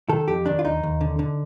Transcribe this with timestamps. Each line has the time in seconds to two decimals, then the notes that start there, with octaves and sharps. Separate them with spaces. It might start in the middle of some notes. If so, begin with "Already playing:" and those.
0.09 D#3 A4
0.28 F2 G4
0.46 D#3 D4
0.59 F4
0.65 D#2 D#4
0.83 D#2
1.01 D3
1.19 D3